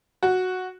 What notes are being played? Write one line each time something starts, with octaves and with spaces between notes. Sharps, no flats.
F#4